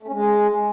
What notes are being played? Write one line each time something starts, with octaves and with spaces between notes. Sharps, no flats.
A3
C#4
G#3